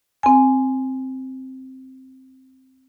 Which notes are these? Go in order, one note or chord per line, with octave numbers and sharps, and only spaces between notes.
C4 G#5